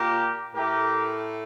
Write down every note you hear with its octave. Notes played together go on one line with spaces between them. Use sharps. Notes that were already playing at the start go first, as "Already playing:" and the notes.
Already playing: A#2 G4 A#4
A2 A3 G4 A#4